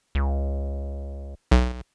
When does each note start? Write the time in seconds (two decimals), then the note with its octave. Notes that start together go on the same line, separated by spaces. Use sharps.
0.15 C#2
1.51 B1